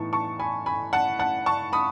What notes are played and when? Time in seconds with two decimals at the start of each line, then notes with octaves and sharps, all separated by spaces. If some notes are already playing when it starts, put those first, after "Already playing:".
Already playing: A2 E3 B3 D#4 A5 C#6
0.13 A5 C#6
0.39 G#5 B5
0.66 G#5 B5
0.93 F#5 A5
1.19 F#5 A5
1.46 A5 C#6
1.73 B5 D#6